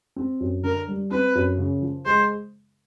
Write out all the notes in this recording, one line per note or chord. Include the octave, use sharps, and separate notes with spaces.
C4
F#2
D3 A#4
G3
C4 B4
F#2
C#3
F3
G#3 C5